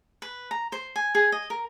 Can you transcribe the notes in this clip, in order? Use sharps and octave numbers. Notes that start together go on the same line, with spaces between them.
B4
A#5
C5
G#5
G#4
D#5
A#4